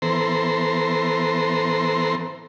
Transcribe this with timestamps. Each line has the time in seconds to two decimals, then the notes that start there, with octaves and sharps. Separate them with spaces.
0.02 E3 B3 A4 C5 A#5 C6